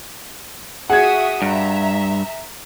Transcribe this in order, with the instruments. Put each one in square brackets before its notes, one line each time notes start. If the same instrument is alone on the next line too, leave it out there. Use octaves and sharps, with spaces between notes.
[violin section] F#4 E5 D#6 [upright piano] G#4 G#6 [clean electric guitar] F#5
[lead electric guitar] G2 [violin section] E5 A#5